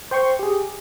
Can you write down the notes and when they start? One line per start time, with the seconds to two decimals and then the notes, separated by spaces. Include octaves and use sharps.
0.11 C5 G5 C6 C#6
0.39 G4 G#4